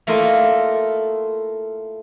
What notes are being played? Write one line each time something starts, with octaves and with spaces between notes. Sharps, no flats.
A3 A#3 E4 F4 D#5